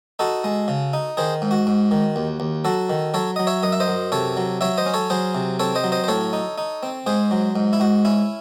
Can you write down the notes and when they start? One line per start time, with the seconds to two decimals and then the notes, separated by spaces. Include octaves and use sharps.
0.19 D#4 F#4 A4
0.44 G#3
0.68 C#3
0.93 D#4
1.17 D#3 G#4 C5
1.42 G#2
1.51 F#4
1.67 G#2
1.91 D#3
2.16 D#2
2.40 D#2
2.65 F#3 F#4 A4
2.90 D#3
3.14 F#3 A4 C#5
3.36 F#3 D#5
3.47 C#5 E5
3.63 F#2 D#5
3.72 E5
3.80 C5 D#5
3.88 F#2
4.12 C3 A4 C#5
4.37 F#3
4.61 F#3 C#5 E5
4.78 C5 D#5
4.86 C#4
4.94 A4 C#5
5.10 F#3 G#4 C5
5.35 C3
5.59 C4 A4 C#5
5.75 C5 D#5
5.84 F#3
5.92 C5 D#5
6.04 C5
6.08 A2 A4 C#5
6.33 D#4
6.58 D#4
6.83 C4
7.06 G#2 G#4 C5
7.31 F#3
7.56 G#2
7.73 E4
7.80 G#2 F#4
8.05 C#4 E4